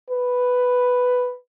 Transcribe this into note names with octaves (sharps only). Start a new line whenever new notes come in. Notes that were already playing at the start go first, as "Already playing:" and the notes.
B4